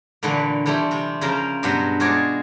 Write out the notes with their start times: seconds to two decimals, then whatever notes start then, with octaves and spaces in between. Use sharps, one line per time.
0.23 A#2 D3 E3 A3 B4 F#5
0.66 E3 G3 A3 C4 E4
0.91 C3 C4
1.21 C#3 F3 C#4 A#4 C5
1.63 G2 B2 F#3 B4 C5 F#5
2.00 G#3 F4 F#4 G#4 C#5 D5